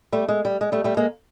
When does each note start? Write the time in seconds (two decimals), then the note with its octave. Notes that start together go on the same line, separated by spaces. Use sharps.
0.12 G3 A3
0.28 G#3
0.45 G3
0.61 G#3
0.72 G3 A3
0.84 G3 A3
0.97 G#3 A#3